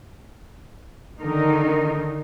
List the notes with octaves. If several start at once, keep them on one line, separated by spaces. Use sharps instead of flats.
D3 D#3 D#4 A#4